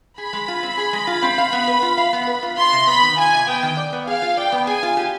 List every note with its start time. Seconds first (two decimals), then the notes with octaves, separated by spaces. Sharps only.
0.18 G#4 B5
0.33 G#3
0.48 F4
0.63 C4
0.78 G#4
0.93 G#3
1.07 F4
1.22 C4
1.38 F5
1.53 B3
1.68 B4
1.82 F4
1.97 F5
2.13 B3
2.27 B4
2.43 F4
2.57 F4 C6
2.73 C3
2.87 B3 B5
3.03 D#3
3.17 F4 G#5
3.32 C3
3.47 B3 G5
3.63 D#3
3.77 D5
3.93 B3
4.07 G#4 F5
4.22 F4
4.37 D5 G5
4.52 B3
4.67 G#4 G#5
4.83 F4
4.97 G4